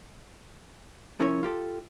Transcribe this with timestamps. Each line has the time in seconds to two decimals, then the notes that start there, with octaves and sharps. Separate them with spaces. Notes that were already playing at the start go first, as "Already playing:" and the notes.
1.20 C2 F3 C#4 E4 A#4 C#5
1.43 F4 G4 A4